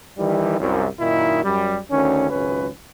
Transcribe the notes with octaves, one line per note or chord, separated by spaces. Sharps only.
D#3 E3 G3
C2 F#2
F#2 A#2 D#3 D#4 E4
F#2 G3
D2 D#3 C#4
G#1 C#2 F#2 C#4 B4